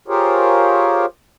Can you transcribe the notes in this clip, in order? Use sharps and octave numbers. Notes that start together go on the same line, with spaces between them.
F4 G4 G#4 A#4 C5 C#5